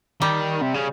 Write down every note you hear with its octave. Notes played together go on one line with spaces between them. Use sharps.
D#3 G3
C3
C#3